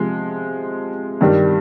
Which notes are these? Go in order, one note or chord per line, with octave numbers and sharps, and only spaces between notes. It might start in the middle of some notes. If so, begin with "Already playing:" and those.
Already playing: C3 F3 G#3
G2 D#3 G3